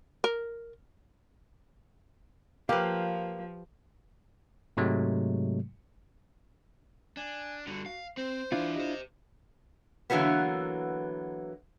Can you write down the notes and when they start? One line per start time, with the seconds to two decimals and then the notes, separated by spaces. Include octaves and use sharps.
0.24 A#4
2.69 F3 A#3 G4 B4 F5
4.77 G#2 C3 F#3 G#3 A3
7.17 D4 G#5
7.67 G2 D3 F#4
7.86 F5
8.17 C4 C5
8.52 E3 D4 E4 F4 F5
8.75 G4 C5 D#5
10.10 D3 E3 F#3 A#3 B3